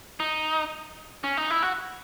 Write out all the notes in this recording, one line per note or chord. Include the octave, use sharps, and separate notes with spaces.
D#4
C#4
D#4
E4
F#4